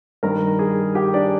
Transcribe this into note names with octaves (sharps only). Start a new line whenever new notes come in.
G2 D#3 A#4 A#5
G#4 G#5
G4 G5
D4 D5